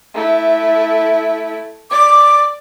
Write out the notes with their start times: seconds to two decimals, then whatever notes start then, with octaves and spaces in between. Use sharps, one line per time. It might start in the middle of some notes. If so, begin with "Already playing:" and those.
0.14 A3 E4
1.91 D5 D6